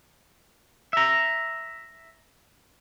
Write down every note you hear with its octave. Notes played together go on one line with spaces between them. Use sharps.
E5 A#5